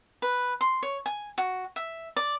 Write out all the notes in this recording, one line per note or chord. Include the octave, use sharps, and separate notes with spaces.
B4
C6
C#5
G#5
F#4
E5
D5